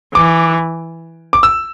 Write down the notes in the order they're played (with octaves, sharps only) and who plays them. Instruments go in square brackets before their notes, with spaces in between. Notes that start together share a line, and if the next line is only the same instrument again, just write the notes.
[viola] E3 [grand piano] D6
[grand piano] D6
E6